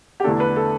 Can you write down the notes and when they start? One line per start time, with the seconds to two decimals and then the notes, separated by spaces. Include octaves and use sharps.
0.20 G4
0.24 E2 D3 A3 D4 A4
0.40 B4
0.56 A4